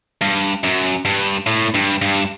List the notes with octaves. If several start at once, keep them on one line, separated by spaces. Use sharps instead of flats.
G2
F#2
G2
A2
G2
G2